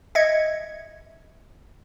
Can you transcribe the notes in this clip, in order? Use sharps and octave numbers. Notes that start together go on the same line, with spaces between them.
D#5 E5 G#6 C#7